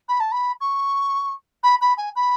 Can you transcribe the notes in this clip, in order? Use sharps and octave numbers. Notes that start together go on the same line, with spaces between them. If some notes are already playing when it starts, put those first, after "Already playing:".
B5
A5
B5
C#6
B5
B5
G#5
B5